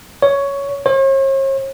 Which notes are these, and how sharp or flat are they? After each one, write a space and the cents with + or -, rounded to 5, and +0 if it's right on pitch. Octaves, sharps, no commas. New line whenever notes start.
C#5 +10
C#5 -45